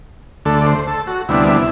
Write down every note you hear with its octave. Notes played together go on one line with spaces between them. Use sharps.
D2 D3 A3 A4
D5
C5
A4
F#4
D2 C3 G3 B3 D4 E4